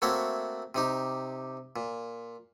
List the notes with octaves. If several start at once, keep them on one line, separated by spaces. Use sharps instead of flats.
A3 A#3 C4 F#4 C#5 E5
C3 D#4 G4
A#2